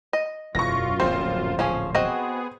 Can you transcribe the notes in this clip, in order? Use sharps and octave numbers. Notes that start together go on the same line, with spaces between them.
D#5
E1 F#2 E3 F4 C#6 A#6
D1 A#1 C3 C4 C5
F3 C#4 G#4
B3 C4 F#4 G#4 D#5